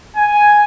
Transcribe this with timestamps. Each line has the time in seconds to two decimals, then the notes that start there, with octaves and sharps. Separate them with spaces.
0.16 G#5